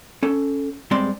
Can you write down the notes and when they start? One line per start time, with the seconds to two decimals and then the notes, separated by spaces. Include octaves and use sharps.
0.23 C#4 A4
0.91 G2 G#3 C4 D5 C6